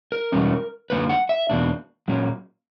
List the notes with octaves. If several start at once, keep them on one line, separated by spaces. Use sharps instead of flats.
A#4
E2 B2 G3 C#4
F#2 D3 A#3 B4
F#5
E5
E2 B2 A#3 D4
A#2 F#3 A#3 C#4